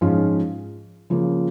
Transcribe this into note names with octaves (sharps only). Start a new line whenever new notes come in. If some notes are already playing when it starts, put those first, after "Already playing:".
G#2 F3 C#4 F4
C#3 F3 A#3